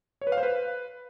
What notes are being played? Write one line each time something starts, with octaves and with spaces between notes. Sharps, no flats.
C#5
B4
F5
C5
B4